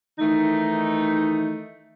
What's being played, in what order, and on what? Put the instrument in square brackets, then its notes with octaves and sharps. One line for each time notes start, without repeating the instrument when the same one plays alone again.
[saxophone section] D#3 E3 A3 D#4